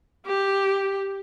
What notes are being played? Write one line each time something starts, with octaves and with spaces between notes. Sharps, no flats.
G4